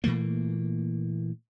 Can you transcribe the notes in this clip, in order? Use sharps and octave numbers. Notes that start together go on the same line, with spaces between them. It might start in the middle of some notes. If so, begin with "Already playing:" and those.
A#2 E3 A3 A#3